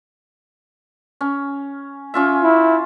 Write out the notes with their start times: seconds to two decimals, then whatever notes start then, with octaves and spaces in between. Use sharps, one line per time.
1.21 C#4
2.14 C#4 F4 E5
2.43 E4